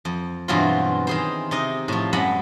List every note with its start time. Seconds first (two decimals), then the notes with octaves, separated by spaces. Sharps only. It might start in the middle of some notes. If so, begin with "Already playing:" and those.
0.05 F2
0.48 G2 B2 E3 F#3 C4 F4
1.07 D#3 G#4 C5
1.51 C3 D#4 D#5
1.88 A2 F3
2.13 F#2 G#3 F#5 B5